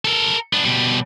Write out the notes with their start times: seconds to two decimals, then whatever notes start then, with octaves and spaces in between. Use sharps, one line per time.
0.05 A4 A#4
0.53 B3 D4
0.65 B2 G3